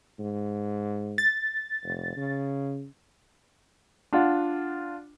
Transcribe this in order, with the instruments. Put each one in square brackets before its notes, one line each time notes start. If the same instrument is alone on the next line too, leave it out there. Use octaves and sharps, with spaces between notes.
[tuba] G#2
[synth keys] A6
[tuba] F1
C#3
[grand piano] D4 F4 F#5